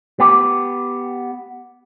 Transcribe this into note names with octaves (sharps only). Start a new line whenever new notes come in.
B3 G4